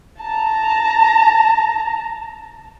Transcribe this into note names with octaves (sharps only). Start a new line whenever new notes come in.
A5 A#5